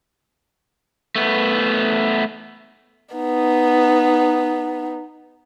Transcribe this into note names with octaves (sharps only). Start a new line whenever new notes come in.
A3 B3
B3 D#4